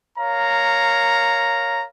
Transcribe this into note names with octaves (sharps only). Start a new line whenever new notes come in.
A#4 C#5 F5 A#5